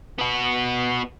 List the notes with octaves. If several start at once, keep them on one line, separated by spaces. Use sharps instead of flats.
B3 F#4